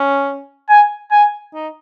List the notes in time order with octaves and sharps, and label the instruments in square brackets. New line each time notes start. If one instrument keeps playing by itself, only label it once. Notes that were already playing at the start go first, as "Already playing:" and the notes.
Already playing: [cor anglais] C#4
[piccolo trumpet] G#5
G#5
[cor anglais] D#4